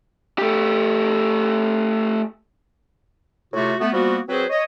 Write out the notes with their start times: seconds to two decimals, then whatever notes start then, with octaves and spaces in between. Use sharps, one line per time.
0.38 A3 G4
3.53 A2 C3 A3 F4 F#4
3.81 A3 B3
3.93 F3 G3 A#3 B3 F#4
4.29 F#3 C4 F#4 G#4 B4 C5
4.50 C#5 D#5